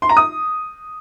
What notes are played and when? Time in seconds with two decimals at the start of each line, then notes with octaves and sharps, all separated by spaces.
0.02 C6
0.09 A#5
0.17 D#6